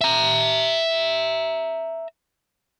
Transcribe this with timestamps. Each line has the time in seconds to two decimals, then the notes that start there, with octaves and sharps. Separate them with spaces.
0.01 E5 A#5